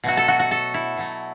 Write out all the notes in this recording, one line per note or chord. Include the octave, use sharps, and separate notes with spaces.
B2 F#3 A3 F#4
A4
F#4
F#4
A4
E4
B2 F#3 A3